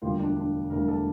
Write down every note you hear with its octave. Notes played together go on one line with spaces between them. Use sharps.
E1 D2 D3 G3 A#3 F4
D4
D4
E1 D2 D3 G3 A#3 A#4
A4